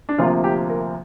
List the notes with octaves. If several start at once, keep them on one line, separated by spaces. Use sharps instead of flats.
D4
D2 C3 F3 A#3 F4
G4
A#4